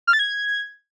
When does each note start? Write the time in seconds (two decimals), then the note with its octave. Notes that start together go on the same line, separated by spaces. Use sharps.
0.07 F6
0.13 A6
0.19 G#6